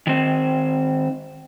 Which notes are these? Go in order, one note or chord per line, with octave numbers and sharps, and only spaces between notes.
D#3 C4